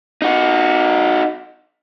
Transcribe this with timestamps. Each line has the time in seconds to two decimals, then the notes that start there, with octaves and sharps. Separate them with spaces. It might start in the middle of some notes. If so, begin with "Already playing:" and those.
0.22 D#4 F#4